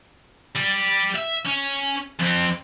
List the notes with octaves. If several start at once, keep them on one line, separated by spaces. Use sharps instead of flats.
G3 G4
E5
C#4
F2 C4